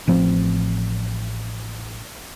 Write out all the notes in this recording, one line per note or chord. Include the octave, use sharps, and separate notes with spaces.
A1 F3 C4